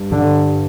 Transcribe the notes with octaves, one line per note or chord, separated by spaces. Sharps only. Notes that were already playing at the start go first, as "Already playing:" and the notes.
Already playing: G2
D3